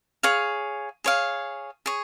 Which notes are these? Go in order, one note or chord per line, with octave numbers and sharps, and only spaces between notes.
G#4 C#5 F5
G#4 C#5 F5
G#4 C#5